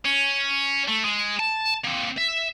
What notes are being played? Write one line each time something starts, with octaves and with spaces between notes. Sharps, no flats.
C#4
A3
G#3
A5
A#3 C4
E5